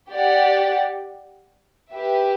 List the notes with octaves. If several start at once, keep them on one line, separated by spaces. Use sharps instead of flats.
G4 D5 F#5
G4 B4 E5